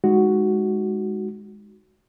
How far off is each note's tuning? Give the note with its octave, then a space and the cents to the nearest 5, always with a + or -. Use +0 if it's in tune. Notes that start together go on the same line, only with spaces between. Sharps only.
G#3 +0 D#4 +0 F#4 +5